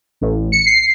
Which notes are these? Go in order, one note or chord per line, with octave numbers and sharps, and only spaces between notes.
A1
C#7
C7